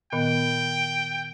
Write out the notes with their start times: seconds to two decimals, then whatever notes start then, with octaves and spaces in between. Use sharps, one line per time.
0.13 A#2 D#3 B3 G5